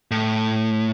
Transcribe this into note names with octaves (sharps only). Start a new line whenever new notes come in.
A2